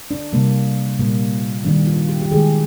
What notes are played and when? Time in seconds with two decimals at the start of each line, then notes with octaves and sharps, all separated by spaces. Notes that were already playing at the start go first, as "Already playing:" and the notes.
0.11 D4
0.33 C3 G3 A#3
0.99 A#2 G3 A#3
1.65 D#3 G3 A#3 D4
1.87 F4
2.09 G4
2.22 G4
2.32 D#3 G#3 G#4